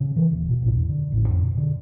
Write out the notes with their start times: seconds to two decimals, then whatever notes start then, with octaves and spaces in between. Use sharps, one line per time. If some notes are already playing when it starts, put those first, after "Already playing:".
0.01 C#3
0.16 E3
0.31 D#1
0.49 B2
0.63 A1
0.75 E2
0.89 D3
1.12 A1
1.28 F2
1.42 B2
1.57 D3